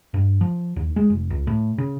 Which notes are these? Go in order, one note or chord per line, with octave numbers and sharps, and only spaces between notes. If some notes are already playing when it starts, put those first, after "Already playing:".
G2
F3
D#2
G#3
F1
C#2
A2
C#3